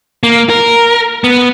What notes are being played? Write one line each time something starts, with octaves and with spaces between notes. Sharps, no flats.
A#3
A#4
B3